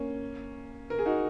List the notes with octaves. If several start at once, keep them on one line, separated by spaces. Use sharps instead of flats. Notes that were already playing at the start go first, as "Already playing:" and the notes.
Already playing: A#3 C#4
A#4
G#4
D#4 F#4